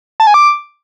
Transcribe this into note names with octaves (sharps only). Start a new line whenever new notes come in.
A5
G#5
D6